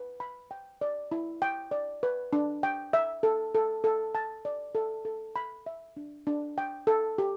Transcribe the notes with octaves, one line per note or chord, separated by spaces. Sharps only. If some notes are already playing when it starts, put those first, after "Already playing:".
Already playing: B4
B5
G5
D5
E4
G5
D5
B4
D4
G5
E5
A4
A4
A4
A5
D5
A4
A4
B5
E5
D4
D4
G5
A4
G4